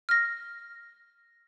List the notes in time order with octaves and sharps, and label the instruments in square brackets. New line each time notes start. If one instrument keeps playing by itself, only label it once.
[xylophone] F6 A#6